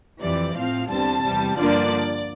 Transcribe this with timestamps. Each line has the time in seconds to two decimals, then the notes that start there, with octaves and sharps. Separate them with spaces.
0.21 F2 C3 E3 D5
0.55 A2 F3 C4 F5
0.89 E2 D3 G3 C4 A5
1.23 E2 C3 G3
1.57 G2 D3 F3 A#3 D4 D5